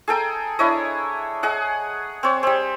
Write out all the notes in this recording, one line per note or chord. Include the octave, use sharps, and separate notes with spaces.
G#4 A4 G5 A#5
D4 E4 C#5 D#5
G#4 D#5 F#5
C4 C#5
G3 C4